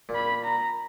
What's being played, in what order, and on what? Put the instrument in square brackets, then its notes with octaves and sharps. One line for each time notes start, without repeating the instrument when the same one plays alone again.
[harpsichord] A#2
[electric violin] B5
A#5